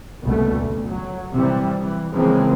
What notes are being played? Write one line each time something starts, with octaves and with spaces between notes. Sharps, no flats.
F#1 C2 B2 A3
D2
F#3
C3 E3 G3
E3
C#3 E3 F3 G#3 A#3 C4